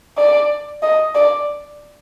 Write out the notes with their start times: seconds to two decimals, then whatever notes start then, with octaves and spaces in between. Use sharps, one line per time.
0.18 D5
0.83 D#5
1.15 D5